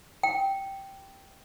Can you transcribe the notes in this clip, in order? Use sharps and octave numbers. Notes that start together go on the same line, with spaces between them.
G5